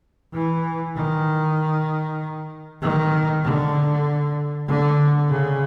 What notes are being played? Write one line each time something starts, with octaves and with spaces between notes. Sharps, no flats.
E3
D#3
D#3
D3
D3
C#3